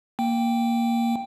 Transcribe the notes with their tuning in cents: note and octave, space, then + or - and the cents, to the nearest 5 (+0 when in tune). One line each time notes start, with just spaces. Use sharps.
A#3 +0 G5 +0